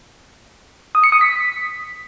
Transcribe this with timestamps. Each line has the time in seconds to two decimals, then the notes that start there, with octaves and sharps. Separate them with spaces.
0.95 D#6
1.04 C#7
1.12 D#6
1.21 B6